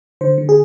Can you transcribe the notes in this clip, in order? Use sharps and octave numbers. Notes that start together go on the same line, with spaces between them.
D3 C5
D3
G#4